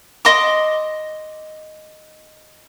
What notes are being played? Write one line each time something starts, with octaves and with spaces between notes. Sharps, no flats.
D#5 C6 D6